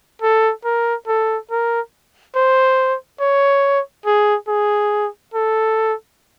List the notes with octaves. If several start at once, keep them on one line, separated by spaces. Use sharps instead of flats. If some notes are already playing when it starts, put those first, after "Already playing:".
A4
A#4
A4
A#4
C5
C#5
G#4
G#4
A4